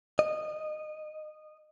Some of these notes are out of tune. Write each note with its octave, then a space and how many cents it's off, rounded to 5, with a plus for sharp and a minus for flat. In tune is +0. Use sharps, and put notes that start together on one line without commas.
D#5 -20